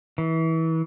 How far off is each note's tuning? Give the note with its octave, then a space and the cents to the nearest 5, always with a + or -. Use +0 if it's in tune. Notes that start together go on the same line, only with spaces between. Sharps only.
E3 -25